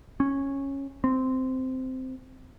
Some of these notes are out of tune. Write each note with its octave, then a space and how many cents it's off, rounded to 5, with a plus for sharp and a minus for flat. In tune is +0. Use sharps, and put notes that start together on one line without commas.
C#4 -10
C4 -10